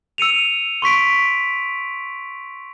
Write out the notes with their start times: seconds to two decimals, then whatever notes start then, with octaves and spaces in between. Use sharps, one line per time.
0.18 E6 C#7 D#7 F7
0.82 C6 C#6 B6 D7